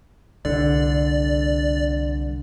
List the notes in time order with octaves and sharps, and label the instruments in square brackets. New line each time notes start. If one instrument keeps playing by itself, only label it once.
[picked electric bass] C2 D3 [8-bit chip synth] D5